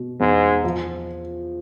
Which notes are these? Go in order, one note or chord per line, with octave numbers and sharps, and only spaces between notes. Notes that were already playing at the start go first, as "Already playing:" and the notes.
Already playing: B2
E2 G#2
F3